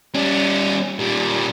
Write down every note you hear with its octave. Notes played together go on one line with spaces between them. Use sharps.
G3 C#4
A#2 G3